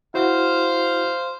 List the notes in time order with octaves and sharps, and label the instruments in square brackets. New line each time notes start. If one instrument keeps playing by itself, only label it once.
[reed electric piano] E4 F#4 [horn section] C5 F5